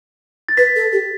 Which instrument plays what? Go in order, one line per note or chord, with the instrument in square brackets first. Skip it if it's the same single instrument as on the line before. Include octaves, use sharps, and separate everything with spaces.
[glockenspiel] A6
[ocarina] B4 [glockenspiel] B6
[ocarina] A4
G4